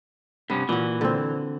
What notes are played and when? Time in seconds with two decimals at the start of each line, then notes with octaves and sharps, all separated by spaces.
0.50 G2 C3 B3 C#4
0.69 A#2 E3 F#4
1.01 D3 C4